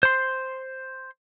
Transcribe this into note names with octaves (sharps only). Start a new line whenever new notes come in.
C5 C6